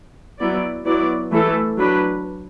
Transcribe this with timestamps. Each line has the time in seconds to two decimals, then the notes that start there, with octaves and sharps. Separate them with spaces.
0.39 F#3 B3 E4 D5
0.85 F#3 B3 E4 D5
1.31 E3 A3 E4 A4
1.78 F#3 D4 B4